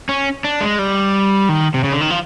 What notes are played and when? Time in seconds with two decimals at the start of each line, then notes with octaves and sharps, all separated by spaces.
0.09 C#4
0.44 D4
0.61 G#3
0.79 G3
1.49 D#3
1.74 C3
1.84 C#3
1.93 D3
2.01 D#3
2.10 F3